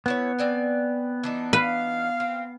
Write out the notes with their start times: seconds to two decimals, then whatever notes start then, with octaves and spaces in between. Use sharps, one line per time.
0.06 B3 C#4 E4 C#5
0.39 C4 D5 G#5
1.23 E3 D4 D#4
1.53 B4 F5
2.20 C4